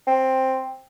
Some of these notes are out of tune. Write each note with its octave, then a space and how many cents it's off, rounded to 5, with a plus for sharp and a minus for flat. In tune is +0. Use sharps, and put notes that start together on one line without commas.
C4 +5